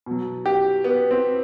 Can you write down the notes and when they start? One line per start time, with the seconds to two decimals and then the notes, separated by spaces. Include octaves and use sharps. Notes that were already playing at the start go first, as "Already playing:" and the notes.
0.06 B2 F#3
0.46 G4
0.84 B3
1.11 C4